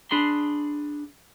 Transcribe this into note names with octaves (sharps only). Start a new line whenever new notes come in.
D4 G#4 B5 C6